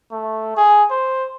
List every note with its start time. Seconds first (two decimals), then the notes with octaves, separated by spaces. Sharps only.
0.12 A3
0.57 G#4
0.90 C5